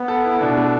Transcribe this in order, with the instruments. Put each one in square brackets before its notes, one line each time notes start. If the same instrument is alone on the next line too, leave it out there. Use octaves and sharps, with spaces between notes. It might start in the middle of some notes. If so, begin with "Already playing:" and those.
Already playing: [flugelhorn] B3
[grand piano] A4
E4
[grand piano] B2 [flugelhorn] D4
[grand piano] A3